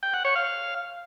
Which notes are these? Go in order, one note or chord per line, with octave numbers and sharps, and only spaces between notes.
G5
F#5
C#5
F5